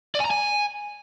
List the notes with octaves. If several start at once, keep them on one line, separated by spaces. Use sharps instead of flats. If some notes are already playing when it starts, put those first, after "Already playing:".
D5
G#5
A#5
G#5